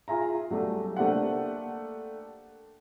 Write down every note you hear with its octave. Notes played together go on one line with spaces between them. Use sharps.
F4 G#4 E5 A#5
F#3 G3 A3 G4
A3 A#3 D4 G4 C5 F#5